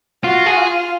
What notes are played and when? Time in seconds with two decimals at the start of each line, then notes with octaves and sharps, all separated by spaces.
0.24 F4 F#4
0.46 G#4
0.57 F4